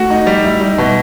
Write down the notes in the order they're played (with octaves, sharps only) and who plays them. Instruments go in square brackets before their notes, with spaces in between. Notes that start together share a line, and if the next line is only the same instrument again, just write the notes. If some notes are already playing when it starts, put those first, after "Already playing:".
Already playing: [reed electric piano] A3 [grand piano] F#4
[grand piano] D#4
G3
E4
[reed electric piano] G3 [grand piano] D#4
[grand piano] B2